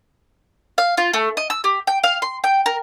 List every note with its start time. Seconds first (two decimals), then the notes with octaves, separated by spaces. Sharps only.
0.78 F5
0.97 F4
1.13 A3
1.37 D#5
1.50 E6
1.64 G4
1.87 G5
2.04 F5
2.22 C6
2.44 G5
2.66 A#4